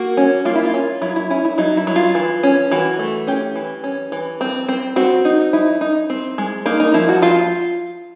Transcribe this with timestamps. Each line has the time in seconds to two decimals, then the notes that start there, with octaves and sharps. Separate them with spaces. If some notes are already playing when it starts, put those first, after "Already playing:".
Already playing: A#3 F#4
0.17 C#4
0.45 A#3 F4
0.55 E4
0.65 F4
0.74 C#4
1.02 F#3 E4
1.16 E4
1.30 C#4 E4
1.45 E4
1.58 F#3 D#4
1.77 E4
1.87 F#3
1.96 F4
2.15 E3
2.43 C#4
2.71 E3 F#4
2.99 A3
3.27 C#4 G4
3.56 E3
3.84 C#4
4.12 E3
4.41 C4
4.68 C4
4.96 C4 F#4
5.25 D#4
5.53 D#4 E4
5.81 D#4
6.10 C4
6.38 G#3
6.66 A#3 D#4
6.80 D#4
6.94 F3 E4
7.09 F#4
7.22 F3 F4